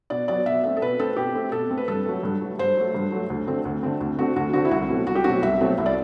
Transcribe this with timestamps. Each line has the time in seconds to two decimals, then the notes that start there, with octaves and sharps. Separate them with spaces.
0.10 B2 D5
0.28 F#3 B3 D5
0.46 B2 E5
0.64 A3 C4 E5
0.77 A4
0.82 B2 B4
0.99 A3 C4 A4
1.17 B2 G4
1.35 A3 C4
1.52 B2 A4
1.70 A3 C4
1.78 B4
1.88 G2 A4
2.05 F#3 A3
2.23 G2
2.41 F#3 A3
2.59 G2 C5
2.77 F#3 A3
2.94 G2
3.12 F#3 A3
3.30 D2
3.47 D3 A3 C4
3.65 D2
3.83 D3 A3 C4
4.01 D2
4.18 D3 A3 C4 F#4
4.36 D2 F#4
4.53 D3 A3 C4 F#4
4.65 E4
4.71 C2 F#4
4.89 B2 F#3 A3 C4
5.07 C2 F#4
5.15 G4
5.24 B2 F#3 A3 C4 F#4
5.42 C2 E5
5.61 B2 F#3 A3 C4
5.78 C2 E5
5.86 D5